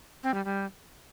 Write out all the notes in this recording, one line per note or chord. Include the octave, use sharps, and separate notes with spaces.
C4
G3
G3